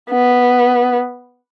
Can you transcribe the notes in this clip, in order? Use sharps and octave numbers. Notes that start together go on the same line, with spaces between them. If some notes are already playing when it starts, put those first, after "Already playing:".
B3